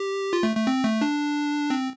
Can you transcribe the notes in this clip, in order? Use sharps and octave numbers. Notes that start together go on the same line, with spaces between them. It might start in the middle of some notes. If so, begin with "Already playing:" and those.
Already playing: G4
F4
A3
A3
C4
A3
D4
C4